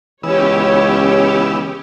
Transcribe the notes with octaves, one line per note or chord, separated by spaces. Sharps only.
C#2 E3 B3 C#4 G4 C#5 E6